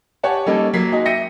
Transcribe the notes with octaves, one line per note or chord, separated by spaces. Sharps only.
G4 C#5 F#5 G#5 A5
G3 A#3 C#4 D#4 A4
F#3 A#3 B6 C7
G#3 D#4 F#4 G#4
E5 G5 A#6 C#7 D#7